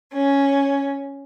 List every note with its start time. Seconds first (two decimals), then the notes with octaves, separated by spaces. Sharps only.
0.12 C#4